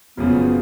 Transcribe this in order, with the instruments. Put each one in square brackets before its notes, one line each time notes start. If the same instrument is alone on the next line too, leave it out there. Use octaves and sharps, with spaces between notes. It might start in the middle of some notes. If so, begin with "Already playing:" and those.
[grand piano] F#1 F#2 C#3 F3 [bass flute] B3